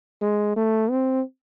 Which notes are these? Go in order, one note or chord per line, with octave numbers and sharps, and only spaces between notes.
G#3
A3
C4